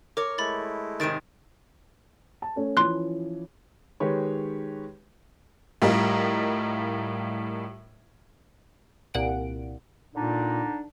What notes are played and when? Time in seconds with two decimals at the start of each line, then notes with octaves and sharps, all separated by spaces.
0.17 A#4 C#5 D6
0.38 G#3 A3 E4 B5 A6
1.00 G#2 C3 D#3 A6 D7
2.42 A5
2.56 A3 C#4
2.77 E3 F3 C#4 C6 F#6
4.00 D#3 G#3 G4 B4 C#5
5.82 A2 G3 F4 A#4 D#5
9.14 C2 A#2 F#5 D7
10.15 A#2 D3 D4 D#4